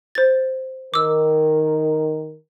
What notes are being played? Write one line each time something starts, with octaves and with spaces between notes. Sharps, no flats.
C5 A6
D#3 A#4 D6 E6